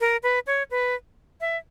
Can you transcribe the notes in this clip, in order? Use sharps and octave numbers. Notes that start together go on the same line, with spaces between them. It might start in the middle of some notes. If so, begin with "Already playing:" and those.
A#4
B4
C#5
B4
E5